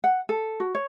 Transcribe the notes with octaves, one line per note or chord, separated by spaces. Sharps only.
F#5
A4
F#4
C#5